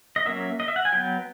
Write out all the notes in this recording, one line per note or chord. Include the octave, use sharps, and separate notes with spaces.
D#5
F#3 A#3 C#4 E5
D#5
E5
F#5
G#5
F#3 B3 G5